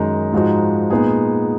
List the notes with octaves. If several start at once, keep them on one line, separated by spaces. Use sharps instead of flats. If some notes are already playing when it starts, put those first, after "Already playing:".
Already playing: F#2 D#3 G#3 D#4
G#2 F3 G#3 D#4 F#4
A#2 G#3 B3 D#4 G#4